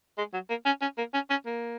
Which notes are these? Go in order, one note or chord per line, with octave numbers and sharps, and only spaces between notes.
G#3
F#3
A#3
C#4
C#4
A#3
C#4
C#4
A#3